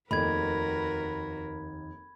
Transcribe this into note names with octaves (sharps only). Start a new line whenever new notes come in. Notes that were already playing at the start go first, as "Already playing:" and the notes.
F1 D#2 F#4 A#4 B4 B5 G#6